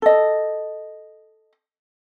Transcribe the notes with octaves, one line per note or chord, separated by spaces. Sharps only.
A4 D#5